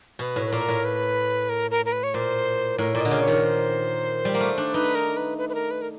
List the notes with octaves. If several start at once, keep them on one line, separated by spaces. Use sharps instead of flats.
B2 B4
A2
B4
A#2 A#4
A2
B4
A#4
A#4
A#4
B4
C#5
A#2 C5
A2 A#4
A#2 D5
D3 D#5
C#3
C#5
D#3
C5
G3
A#3
A3
D4
D#4 B4
A#4
B4
B4
B4
A#4
B4
A#4